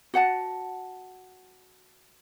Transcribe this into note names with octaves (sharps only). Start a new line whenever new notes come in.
F#4 F#5 G5 A5